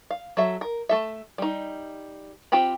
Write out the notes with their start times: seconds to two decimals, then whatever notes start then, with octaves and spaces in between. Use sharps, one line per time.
0.11 F5
0.37 F#3 A4 E5
0.61 A#4
0.89 A3 A4 E5
1.38 G3 D#4
2.52 C4 F4 G4 B5